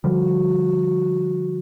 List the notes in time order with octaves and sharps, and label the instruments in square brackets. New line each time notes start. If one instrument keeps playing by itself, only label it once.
[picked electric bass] D3 F3 G3 [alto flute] F#4